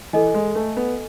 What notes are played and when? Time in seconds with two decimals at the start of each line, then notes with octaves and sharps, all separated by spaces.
0.13 E3 A4 D#5 G#5
0.34 G#3
0.55 A3
0.77 B3